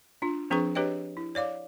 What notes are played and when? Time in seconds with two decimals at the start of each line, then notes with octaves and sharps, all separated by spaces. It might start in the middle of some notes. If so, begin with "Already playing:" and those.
0.22 D4 F4
0.50 F3 C4 D4 G#4 B4 C#6
0.75 D4 G4 B4 C#5 D#5 G5
1.17 E4
1.35 C#5 D5 F5 D6